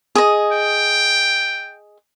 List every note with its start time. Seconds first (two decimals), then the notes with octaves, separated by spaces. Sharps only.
0.15 G#4 D#5
0.53 G5